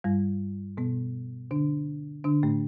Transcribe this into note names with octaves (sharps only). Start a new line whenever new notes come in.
G2 G3
B2 B3
D3 D4
D3 D4
A2 A3